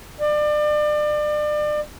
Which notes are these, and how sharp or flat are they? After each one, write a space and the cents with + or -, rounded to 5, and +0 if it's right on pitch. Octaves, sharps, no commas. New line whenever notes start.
D5 +35